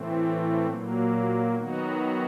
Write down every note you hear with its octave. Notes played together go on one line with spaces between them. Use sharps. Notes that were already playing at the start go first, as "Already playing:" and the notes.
Already playing: A2 E3 A3 C4
A#2 F#3 A#3
D#3 F#3 B3 D#4 F#4